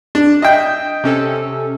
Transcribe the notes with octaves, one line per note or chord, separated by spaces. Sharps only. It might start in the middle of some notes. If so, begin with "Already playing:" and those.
D4
D#5 E5 G5
C3 C#4 A4